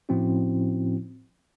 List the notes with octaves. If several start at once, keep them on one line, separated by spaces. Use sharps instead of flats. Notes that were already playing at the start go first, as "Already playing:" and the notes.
A2 F3 C4 C#4 E4 F#4